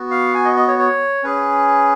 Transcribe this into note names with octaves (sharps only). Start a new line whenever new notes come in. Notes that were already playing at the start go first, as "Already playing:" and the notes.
Already playing: B3 F#4
F5
G#5
D#5
D#5
C#5
C#5
C#4 G#4 B4